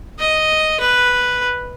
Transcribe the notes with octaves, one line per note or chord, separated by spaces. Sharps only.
D#5
B4